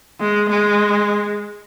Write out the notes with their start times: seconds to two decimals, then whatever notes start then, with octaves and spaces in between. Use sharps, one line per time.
0.20 G#3
0.49 G#3